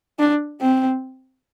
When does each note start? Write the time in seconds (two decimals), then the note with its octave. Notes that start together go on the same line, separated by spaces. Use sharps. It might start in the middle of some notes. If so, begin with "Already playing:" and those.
0.19 D4
0.61 C4